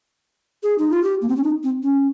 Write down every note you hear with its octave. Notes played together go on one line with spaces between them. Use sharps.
G#4
D#4
F4
G4
A#3
C4
C#4
D#4
C4
C#4